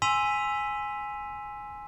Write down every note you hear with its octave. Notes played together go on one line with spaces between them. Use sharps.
G#5 C6 E6 B6 D#7 F7